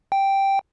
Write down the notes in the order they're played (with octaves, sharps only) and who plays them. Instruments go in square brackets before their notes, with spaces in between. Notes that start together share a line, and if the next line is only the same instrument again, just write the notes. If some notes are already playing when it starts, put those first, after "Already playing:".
[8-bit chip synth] G5